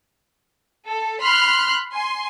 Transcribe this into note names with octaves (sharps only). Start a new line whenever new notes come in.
A4
B5 C6 F6 F#6
G#5 C6